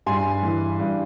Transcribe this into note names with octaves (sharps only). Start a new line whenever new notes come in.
G2 G#5 C6
E3
G2